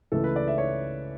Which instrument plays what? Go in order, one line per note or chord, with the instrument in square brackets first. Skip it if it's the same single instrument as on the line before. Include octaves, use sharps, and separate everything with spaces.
[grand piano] C#2 C#3 E3 A3 A4
B4
D5
E5
C#5